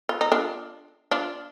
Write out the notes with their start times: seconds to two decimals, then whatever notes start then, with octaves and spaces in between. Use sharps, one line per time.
0.09 F4
0.21 D#4
0.32 D4 F4
1.11 D4 F4